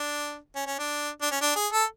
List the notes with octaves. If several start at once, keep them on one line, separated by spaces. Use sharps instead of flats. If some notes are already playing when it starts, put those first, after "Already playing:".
Already playing: D4
C#4
C#4
D4
D4
C#4
D4
G#4
A4